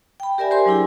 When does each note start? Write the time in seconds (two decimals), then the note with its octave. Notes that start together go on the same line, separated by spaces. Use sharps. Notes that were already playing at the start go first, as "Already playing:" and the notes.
0.20 G5 B5
0.38 G4 A#4 D5 E5 G#5
0.51 G4 C5 G#5 C6
0.66 F#3 D4 E4 G#4